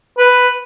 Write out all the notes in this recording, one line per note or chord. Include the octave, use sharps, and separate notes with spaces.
B4